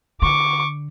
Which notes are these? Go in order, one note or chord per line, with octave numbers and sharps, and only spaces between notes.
D3 C#6 D6